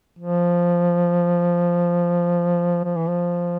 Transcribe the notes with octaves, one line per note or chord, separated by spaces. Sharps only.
F3
F3
E3
F3